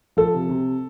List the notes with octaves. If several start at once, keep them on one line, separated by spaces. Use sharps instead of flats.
F3 A4
C3
C3